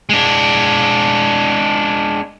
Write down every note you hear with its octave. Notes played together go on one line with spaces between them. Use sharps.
G#3 D4